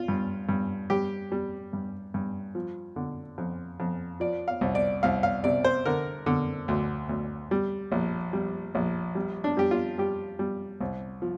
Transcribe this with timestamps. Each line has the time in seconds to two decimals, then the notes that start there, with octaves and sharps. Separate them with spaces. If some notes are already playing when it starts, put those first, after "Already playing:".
Already playing: F4
0.08 G2
0.49 G2
0.90 G2 G4
1.32 G3
1.73 G2
2.14 G2
2.55 F3
2.96 D3
3.38 F2
3.80 F2
4.20 F3 D5
4.48 F5
4.61 C2
4.75 D5
5.03 C2 F5
5.23 F5
5.44 C3 D5
5.64 C5
5.86 D3 A#4
6.26 D3
6.68 D2
7.09 D2
7.51 G3
7.92 A#1
8.33 G3
8.75 A#1
9.15 G3
9.44 D4
9.57 G3 G4
9.71 F4
9.98 G3 G4
10.39 G3
10.81 C2
11.22 F3